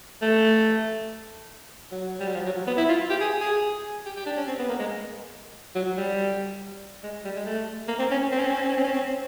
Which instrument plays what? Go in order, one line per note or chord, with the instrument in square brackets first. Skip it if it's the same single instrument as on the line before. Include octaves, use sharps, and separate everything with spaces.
[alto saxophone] A3
F#3
G3
F#3
F3
F#3
B3
E4
F4
G4
G#4
G#4
G4
G4
D4
C#4
C4
B3
A#3
G#3
F#3
G3
G#3
G3
G#3
A3
A#3
C4
C#4
C4
C#4
C4
C#4
C4
C#4
C4
C#4
C4